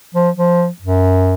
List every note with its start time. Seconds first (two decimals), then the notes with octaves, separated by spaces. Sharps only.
0.14 F3
0.37 F3
0.82 F#2